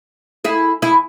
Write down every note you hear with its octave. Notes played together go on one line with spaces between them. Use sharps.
E4 G#4
E4 G#4